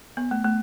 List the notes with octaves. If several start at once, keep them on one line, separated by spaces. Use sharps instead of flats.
B3
A3
A3